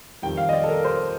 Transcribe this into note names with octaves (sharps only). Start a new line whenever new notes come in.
F2 D#3 G3 G5
F5
D#5
D5
A4
A#4
C5